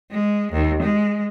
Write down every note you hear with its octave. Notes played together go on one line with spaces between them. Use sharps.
G#3
D#2
G#3